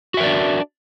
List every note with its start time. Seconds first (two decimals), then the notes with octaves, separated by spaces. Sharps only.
0.14 F#4
0.17 E5
0.20 A#4
0.23 D5
0.26 D4